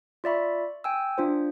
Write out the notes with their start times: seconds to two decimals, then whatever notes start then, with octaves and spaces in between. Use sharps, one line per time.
0.24 F4 D5 E5 B5 C#6
0.84 G5 G#5 E6
1.18 D4 F4 C5